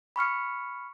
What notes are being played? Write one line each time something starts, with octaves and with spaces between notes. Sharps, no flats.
B5 C#6 F6 C#7